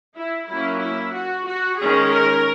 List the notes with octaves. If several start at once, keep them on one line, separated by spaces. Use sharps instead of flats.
E4
F#3 A#3 C#4 E4
E4
F#4
F#4
D#3 G#3 C#4 G#4
A#4